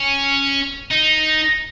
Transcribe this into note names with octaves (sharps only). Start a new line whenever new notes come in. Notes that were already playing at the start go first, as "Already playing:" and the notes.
Already playing: C#4
D#4